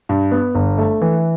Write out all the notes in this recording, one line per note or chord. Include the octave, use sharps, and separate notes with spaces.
G2
B3
G1
A3
E3